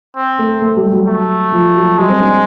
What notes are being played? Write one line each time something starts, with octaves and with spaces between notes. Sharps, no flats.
C4
A3 A4
A3 A4
G3 G4
F#3 F#4
F#3 A3 F#4
F3 F4
F#3 F#4
G3 G#3 G4
C4 C5
D4 D5